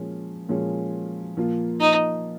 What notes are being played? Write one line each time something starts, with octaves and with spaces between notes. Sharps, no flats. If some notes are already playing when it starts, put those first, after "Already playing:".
Already playing: A#2 F3 G#3 C#4 G#4
A#2 F3 G#3 C#4 G#4
A#2 F3 A#3 F4
D#4